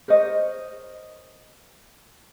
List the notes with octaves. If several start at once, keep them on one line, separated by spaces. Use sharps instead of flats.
A#4 C5 C#5 D#5